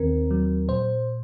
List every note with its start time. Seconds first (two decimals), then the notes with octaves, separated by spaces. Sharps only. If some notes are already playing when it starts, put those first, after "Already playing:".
Already playing: D#2 D#3 C4 A#4
0.31 F#3
0.68 A#2 C5